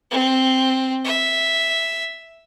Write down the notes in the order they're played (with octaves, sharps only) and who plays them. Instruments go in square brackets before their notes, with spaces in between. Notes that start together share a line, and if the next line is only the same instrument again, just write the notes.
[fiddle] C4
E5